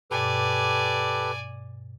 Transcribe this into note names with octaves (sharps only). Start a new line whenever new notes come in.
G2 B2 G4 A4 B4 D5 G#5